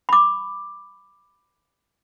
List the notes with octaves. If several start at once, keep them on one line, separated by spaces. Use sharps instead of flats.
B5 D6